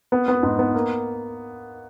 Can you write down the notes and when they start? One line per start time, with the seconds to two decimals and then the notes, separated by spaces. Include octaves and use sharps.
0.12 B3
0.28 B3
0.43 G#2
0.59 B3
0.74 A#3